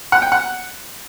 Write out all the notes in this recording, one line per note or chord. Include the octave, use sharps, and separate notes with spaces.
F#5
G5
F#5